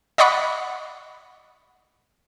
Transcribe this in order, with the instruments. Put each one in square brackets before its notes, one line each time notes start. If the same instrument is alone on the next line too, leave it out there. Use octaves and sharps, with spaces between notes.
[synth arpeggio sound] D5 D#5 F#5 B5 C#6